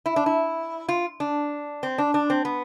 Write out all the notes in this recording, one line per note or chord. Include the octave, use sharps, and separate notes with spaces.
E4
D4
E4
F4
D4
C4
D4
D4
C4
B3